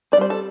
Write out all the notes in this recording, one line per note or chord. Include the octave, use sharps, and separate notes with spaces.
C4 D5
G3 C5
A4